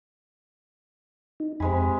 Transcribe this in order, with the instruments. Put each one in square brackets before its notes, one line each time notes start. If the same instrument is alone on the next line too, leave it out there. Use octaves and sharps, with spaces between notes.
[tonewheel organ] D#4
[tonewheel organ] F2 B5 [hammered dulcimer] C3 G#3 G#5